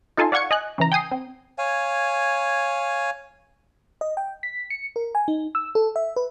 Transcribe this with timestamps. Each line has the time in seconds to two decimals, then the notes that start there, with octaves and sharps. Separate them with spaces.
0.17 D#4 F4 A4 G#5 A5 C6
0.32 D5 F5 F#5 C#6 G#6 C#7
0.51 D#5 G#5 F#6
0.78 C#3 E3 A#5
0.92 G5 G#5 D#6 C7
1.11 C4
1.58 C#5 F5 G#5
4.01 D#5
4.17 G5
4.43 B6
4.70 C#7
4.96 A#4
5.15 G#5
5.28 D#4
5.55 E6
5.75 A4
5.96 E5
6.16 B4